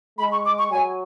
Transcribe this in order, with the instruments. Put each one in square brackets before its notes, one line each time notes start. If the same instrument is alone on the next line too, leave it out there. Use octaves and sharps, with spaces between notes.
[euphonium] G#3 [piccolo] B5
[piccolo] C#6
D6
C#6
[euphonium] F#3 [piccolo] G#5